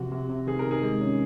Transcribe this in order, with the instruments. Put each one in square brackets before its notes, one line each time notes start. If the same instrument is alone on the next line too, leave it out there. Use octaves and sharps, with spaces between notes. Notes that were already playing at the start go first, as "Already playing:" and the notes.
Already playing: [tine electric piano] C3 F3 [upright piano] F#4
[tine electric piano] C3
C3
[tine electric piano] D#3 [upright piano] G#4
[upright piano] A#4
[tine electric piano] D#3
[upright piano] G#4
[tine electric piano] G#3
C#4